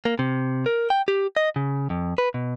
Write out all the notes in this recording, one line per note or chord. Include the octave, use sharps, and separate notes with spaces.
A#3
C3
A#4
G5
G4
D#5
C#3
F2
B4
B2